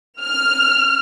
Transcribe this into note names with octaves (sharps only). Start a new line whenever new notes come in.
F6